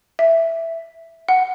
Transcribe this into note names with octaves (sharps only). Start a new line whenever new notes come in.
E5
F#5